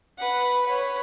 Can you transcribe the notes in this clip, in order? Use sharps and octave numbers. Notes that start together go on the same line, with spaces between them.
B4 F#5
B4 C#5